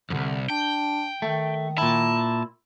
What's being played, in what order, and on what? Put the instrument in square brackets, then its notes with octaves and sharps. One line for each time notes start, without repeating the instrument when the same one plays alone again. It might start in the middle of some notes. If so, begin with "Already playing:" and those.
[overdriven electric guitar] C2 F2 [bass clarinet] D3
[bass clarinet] D4 [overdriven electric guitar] G5
[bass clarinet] D#3 [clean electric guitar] A3
[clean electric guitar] A#2 E4 [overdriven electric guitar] A5